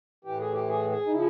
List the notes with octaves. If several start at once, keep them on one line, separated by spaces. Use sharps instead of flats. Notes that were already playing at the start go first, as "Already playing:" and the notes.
A2 E3 G4
G#4
G4
G#4
G#4
D#4
C#3 F3 E4